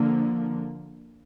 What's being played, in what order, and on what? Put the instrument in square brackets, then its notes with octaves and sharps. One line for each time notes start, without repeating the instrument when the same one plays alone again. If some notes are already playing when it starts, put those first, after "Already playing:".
Already playing: [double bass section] D3 F3 A#3